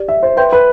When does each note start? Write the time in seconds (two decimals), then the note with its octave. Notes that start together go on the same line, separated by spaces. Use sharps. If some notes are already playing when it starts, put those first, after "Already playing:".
Already playing: G4 D5
0.08 E5
0.23 C5
0.37 B4 E5 G5 C6 G6
0.52 B4